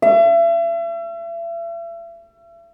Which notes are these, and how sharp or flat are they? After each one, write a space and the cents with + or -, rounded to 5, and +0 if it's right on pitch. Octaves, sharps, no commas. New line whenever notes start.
E5 +40